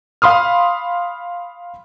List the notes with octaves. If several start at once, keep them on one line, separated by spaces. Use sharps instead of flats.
F5 B5 C6 D#6 F6